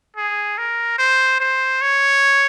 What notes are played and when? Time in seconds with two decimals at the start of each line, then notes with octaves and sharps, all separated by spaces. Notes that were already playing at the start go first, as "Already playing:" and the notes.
0.16 G#4
0.58 A#4
0.98 C5
1.40 C5
1.82 C#5